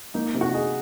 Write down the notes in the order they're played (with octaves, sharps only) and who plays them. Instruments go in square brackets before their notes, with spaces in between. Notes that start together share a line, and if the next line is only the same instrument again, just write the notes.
[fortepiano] A#3 [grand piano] D#4
[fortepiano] C3
[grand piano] F#4
[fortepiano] D#4 [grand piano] G#4